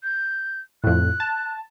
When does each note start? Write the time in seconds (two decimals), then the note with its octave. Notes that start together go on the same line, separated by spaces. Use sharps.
0.03 G6
0.84 F2 A2 F#6
1.20 A5